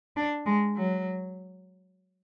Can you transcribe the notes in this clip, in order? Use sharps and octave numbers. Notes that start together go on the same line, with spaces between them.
D4
G#3
F#3